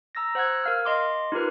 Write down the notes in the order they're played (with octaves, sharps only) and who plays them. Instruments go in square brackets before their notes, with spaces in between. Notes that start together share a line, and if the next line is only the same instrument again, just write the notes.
[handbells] A#5 E6 A6 A#6
C5 F#5 E6 F#6 G#6
A#4 F5 F6
D#5 C6 D6
D#4 F4 G4 A#4 B4